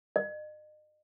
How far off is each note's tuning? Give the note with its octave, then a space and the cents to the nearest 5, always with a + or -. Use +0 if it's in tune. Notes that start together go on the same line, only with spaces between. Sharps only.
D#5 -40